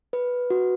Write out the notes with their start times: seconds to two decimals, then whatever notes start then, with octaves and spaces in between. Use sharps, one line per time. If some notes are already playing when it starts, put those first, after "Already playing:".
0.13 B4
0.50 F#4